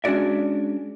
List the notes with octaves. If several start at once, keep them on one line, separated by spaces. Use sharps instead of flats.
G#3 C#4 D4 F#4 D5 E5